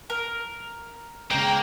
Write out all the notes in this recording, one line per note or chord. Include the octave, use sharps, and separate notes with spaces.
A#4
C#3 G#3 A#3 G5 A#5